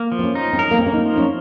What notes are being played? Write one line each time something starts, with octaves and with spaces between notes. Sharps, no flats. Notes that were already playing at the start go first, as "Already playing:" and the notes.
Already playing: A#3
F3
C4
C#4
D#4
C4
C#4 A#4
A#3
C4
A#3 C#4
D#4
F3
C#4